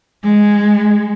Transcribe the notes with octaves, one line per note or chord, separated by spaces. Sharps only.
G#3